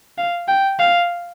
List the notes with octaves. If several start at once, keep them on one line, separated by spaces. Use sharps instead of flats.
F5
G5
F5